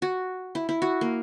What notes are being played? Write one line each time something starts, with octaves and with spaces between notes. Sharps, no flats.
F#4
E4
E4
F#4
A#3